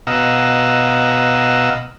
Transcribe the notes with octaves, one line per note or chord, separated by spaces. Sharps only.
B2 D#5 F5 F#5 A#5 E6